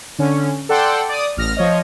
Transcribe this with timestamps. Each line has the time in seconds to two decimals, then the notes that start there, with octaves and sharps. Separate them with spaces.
0.19 D3 C#4
0.69 A4 D5 F#5 G5 C6
1.09 D5 D#6
1.37 A1 F6 A#6
1.57 F3 C#5 D#5